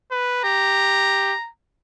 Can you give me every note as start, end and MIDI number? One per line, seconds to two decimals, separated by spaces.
0.11 0.44 71
0.44 1.34 67
0.44 1.48 82